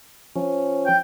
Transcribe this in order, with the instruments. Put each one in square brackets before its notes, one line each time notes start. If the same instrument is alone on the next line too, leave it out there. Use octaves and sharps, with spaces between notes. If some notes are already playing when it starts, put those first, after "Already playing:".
[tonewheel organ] F3 C#4
[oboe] G5